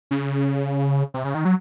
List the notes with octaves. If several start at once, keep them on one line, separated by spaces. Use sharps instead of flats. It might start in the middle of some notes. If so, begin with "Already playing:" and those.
C#3
C3
C#3
D#3
F#3